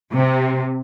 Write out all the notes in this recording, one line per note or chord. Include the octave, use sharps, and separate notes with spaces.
C3